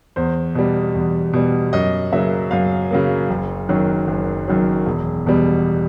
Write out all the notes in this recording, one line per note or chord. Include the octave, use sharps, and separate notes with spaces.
E2 C5
B2 G3
E2
B2 G3
F#2 D#5
C#3 F#3 A#3 E5
F#2 F5
C#3 F#3 A#3
F#1
F#2 D#3 F#3
F#1
F#2 D#3 F#3
E1
E2 B2 G3